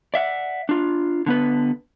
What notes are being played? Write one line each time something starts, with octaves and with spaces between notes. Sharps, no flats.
D5 E5 F#5
D4 F4
D3 B3 B4